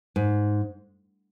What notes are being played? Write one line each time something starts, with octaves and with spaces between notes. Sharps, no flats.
G#2